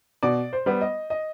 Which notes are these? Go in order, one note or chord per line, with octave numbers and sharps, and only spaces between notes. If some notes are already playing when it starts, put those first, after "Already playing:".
B2 D5
C5
G3 B3
D#5
D#5